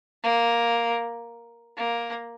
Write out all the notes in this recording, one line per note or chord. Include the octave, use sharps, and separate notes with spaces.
A#3
A#3